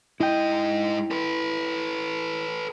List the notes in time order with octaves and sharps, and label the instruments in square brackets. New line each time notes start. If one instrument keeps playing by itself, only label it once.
[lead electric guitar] G#2 D#5 [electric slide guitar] E4 G5
[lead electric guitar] A4 B4